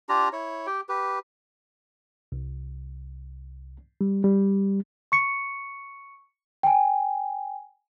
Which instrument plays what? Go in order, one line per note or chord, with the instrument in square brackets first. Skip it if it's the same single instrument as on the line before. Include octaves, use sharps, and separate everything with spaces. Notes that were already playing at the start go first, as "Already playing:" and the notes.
[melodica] D4 F4 G4 A#5
E4 C#5
G4 G5
G4 B4
[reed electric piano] C2
G3
G3
[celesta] C#6 C#7
G5 G#5